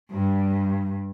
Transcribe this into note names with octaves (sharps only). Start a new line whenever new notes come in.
G2